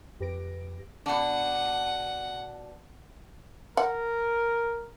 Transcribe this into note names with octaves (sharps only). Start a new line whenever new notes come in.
F2 G4 B4 A#6 D7
B2 D4 F#5
A#4 F#5